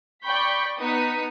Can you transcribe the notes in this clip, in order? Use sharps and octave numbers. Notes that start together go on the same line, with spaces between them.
D5 G5 B5 C#6 G6 B6
B3 D#4 D#6 B6 C#7